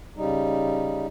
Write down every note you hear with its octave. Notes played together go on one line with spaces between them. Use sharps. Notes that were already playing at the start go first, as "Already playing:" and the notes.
C#3 G3 D#4